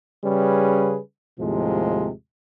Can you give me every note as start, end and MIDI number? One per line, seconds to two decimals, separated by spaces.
0.25 1.00 49
0.25 1.00 55
0.25 1.00 61
0.25 1.00 68
0.25 1.00 71
1.40 2.11 39
1.40 2.11 45
1.40 2.11 48
1.40 2.11 53
1.40 2.11 56